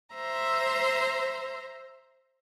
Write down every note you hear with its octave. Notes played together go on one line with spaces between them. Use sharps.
C5 E5 A#5 C6